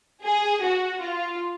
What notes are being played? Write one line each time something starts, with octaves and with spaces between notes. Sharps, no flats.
G#4
F#4
F4